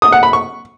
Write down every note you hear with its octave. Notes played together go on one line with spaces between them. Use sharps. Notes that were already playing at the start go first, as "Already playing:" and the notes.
D#6
F#5
B5
C#6